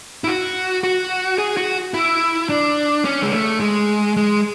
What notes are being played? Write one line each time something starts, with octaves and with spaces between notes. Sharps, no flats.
E4
F#4
F#4
G#4
F#4
E4
D4
C#4
G#3
A3
G#3
G#3